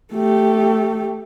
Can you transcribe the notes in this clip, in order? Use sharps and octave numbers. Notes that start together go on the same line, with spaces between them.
A3 G4